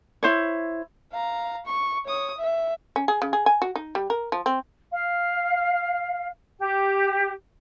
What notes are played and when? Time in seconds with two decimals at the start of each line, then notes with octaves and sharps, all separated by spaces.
0.23 E4 C5 C#5
1.12 F5 A#5
1.66 C#6
2.05 C#5 D#6
2.38 E5
2.96 C#4
3.08 G#4
3.22 C#3
3.33 G#4
3.46 G#5
3.62 F#4
3.76 D#4
3.95 G3
4.10 A#4
4.32 F3
4.46 C4
4.91 F5
6.59 G4